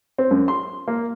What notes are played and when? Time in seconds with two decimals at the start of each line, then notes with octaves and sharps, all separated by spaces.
0.18 C4
0.31 F#2
0.48 C6
0.88 A#3